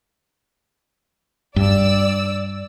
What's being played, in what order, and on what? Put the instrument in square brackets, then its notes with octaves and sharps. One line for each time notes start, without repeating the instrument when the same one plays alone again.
[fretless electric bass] G2 [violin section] D5 E6